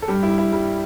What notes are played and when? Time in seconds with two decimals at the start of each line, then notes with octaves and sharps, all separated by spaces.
0.02 A4
0.08 G2 G4
0.23 E4
0.30 G2
0.38 E4
0.52 G3